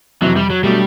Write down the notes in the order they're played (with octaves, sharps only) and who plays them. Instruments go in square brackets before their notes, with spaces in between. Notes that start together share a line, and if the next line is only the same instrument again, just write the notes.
[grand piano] F2 C3 E3 [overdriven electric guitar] F#3
[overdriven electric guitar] G3
F#3
[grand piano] B2 F#3 A3 D4 [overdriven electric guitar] G3